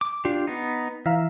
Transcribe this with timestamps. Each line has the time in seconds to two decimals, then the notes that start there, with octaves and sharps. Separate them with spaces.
0.01 D6
0.25 D4 F4 G4
0.47 B3 D#4
1.06 E3 E5 F5 A#5